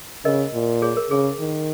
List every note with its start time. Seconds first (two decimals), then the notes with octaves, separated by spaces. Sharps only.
0.25 C#3 A#4 D#5
0.54 A#2
0.82 G#4 C#5
0.97 A#4
1.10 C#3 G#4
1.39 D#3